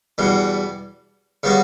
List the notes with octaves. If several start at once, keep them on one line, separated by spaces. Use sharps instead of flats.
E2 B2 G3
C#3 G3 B3 F#4